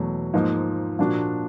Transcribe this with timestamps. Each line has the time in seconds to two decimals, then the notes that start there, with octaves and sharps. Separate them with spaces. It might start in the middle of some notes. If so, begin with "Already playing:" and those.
Already playing: E2 B2 F#3 A3
0.34 G#2 F3 A#3 D#4
0.99 A#2 F3 A#3 D4 F#4